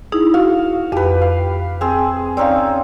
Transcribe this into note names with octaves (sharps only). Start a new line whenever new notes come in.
D#4 E4 G#4
F#4 F5
F2 G4 B4
F5
C4 G#4
C4 C#4 D#4 D5 F5